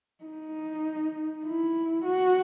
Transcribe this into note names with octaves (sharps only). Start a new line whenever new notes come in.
D#4
E4
F#4